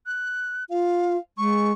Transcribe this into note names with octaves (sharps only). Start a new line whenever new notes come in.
F#6
F4 F5
G#3 C#6